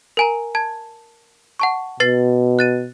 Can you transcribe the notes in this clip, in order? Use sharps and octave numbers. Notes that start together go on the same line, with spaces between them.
A#4 G#5 A#5
A5 G#6
F#5 A5 C#6
B2 B4 A6 C7
F#6 A6 D#7